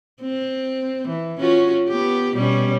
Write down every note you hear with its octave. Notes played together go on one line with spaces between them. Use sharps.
C4
E3
C#4 F4 F#4
B3 G4
B2 G3 C#4